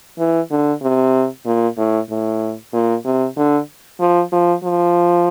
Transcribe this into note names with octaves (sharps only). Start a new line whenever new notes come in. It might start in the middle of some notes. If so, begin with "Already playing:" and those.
E3
D3
C3
A#2
A2
A2
A#2
C3
D3
F3
F3
F3